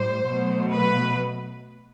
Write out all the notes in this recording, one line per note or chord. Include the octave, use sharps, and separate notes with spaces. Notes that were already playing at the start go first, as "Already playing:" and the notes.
Already playing: A2 G3 C5
B2 F#3 A3
B4